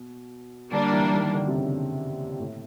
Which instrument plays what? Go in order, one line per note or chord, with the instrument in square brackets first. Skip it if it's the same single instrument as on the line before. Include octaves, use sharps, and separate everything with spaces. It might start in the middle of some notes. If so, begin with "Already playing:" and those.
Already playing: [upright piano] B2
[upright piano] D3 [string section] G3 A#3 D4
[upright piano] E3
D#3
D3
C3
C#3
A2